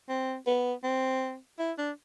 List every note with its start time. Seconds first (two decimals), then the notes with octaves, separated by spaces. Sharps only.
0.09 C4
0.47 B3
0.84 C4
1.59 E4
1.78 D4